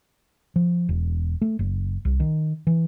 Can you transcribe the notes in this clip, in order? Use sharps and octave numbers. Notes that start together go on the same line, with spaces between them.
F3
E1
A3
F#1
C2
D#3
E3